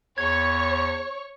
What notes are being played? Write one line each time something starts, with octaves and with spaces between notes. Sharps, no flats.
E2 C#5 C#6 G#6